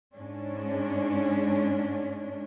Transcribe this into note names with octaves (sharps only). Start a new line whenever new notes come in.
G#2 G#3 C#4 D4